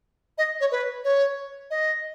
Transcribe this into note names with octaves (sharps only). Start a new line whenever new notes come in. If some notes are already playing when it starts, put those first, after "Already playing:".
D#5
C#5
B4
C#5
D#5